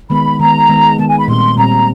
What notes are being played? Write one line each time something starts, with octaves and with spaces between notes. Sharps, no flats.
D#3 G#3 B3 B5
D#3 G#3 B3 A#5
D#3 G#3 B3
D#3 G#3 B3 A5
G#5
B5
A#2 G3 C4 C6
A#2 G3 C4 A#5